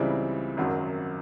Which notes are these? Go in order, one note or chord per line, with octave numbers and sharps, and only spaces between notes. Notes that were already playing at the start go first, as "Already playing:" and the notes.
Already playing: C#2 C#3 E3 G3 C4
G#1 F#2 D#3 F#3